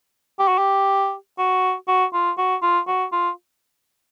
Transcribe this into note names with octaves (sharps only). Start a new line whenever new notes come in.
G4
F#4
G4
F#4
F#4
F4
F#4
F4
F#4
F4